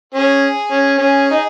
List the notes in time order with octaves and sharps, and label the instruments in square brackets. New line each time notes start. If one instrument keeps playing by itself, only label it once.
[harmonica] C#4 [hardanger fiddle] G#4
[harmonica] C#4
[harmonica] C#4 [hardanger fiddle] G#4
[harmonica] D#4